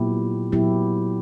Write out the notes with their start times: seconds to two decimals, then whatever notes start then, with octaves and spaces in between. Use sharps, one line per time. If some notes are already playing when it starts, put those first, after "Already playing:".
Already playing: A#2 F#3 B3 E4 G4
0.52 A#2 F#3 B3 E4 G4